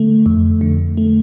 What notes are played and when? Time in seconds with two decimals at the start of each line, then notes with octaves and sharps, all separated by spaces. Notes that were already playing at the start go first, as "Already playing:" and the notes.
Already playing: D3 A3
0.26 F2
0.61 D3
0.97 A3